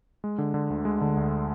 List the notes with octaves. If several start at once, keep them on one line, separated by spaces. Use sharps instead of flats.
G#3
D3
D3
D2
G#3
D3
D2